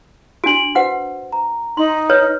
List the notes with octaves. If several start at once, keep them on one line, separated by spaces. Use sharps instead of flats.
D4 F#4 D7 F#7
F#4 B4 C5 F#5
A#5
D#4 C6
B4 C#5 F6